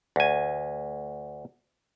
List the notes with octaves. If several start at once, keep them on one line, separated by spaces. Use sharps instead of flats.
D2 G#5